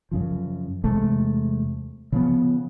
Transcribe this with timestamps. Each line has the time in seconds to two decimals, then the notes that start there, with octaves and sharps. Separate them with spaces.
0.11 F#2 C#3 F3
0.84 E2 C3 G#3 A3
2.12 C#3 F3 B3